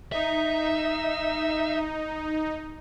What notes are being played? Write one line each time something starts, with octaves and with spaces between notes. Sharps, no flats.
D#4 E5